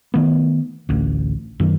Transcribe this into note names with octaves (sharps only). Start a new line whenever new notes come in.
D#3 A3 B3
A1 D2
F#2 D#3